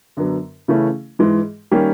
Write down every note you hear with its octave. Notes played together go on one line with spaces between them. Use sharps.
F#2 D3 F#3 B3
C#3 E3 A3 C#4 E4
G#2 E3 G#3
D#3 G3 A#3 C#4